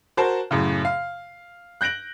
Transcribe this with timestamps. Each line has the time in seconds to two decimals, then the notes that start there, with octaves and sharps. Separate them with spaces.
0.17 F#4 A#4 C5 A5
0.51 F#2 A2 C#3
0.85 F5
1.81 F#6 G6 A#6 D7 F#7